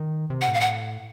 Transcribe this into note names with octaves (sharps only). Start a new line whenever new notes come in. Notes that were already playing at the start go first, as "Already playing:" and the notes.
Already playing: D#3
C3
F#5
A2
F5
F#5